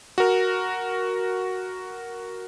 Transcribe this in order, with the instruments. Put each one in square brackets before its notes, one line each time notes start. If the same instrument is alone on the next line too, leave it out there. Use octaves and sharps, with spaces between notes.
[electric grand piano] F#4 A#4